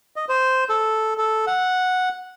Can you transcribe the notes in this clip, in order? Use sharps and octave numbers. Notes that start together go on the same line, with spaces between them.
D#5
C5
A4
A4
F#5